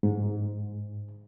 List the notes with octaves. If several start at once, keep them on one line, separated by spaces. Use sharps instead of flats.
G#2